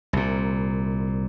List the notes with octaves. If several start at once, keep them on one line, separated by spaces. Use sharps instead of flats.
C2 A#2